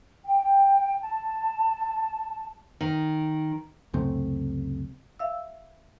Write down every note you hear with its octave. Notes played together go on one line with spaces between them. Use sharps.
G5
A5
D#3
C#2 F#2 C3 A3
E5 F5 E6